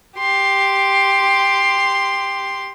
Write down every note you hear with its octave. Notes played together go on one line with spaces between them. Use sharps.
G4 C6